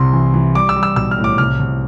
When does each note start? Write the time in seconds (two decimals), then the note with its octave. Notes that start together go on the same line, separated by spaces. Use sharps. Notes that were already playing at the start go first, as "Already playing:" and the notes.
Already playing: C2 C3 C6
0.13 E3
0.34 E3
0.55 G3 D6
0.69 E6
0.76 G3
0.83 E6
0.96 B1 E6
1.11 F6
1.18 A2
1.24 D6
1.38 C2 F6
1.59 C2